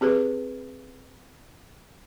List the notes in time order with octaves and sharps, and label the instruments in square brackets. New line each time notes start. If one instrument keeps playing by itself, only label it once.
[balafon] C4 G4 G#4 B4